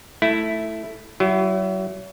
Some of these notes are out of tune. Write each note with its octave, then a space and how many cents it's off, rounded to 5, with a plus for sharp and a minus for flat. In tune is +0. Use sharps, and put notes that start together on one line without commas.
A3 +0 E4 +0
F#3 +35 E4 +15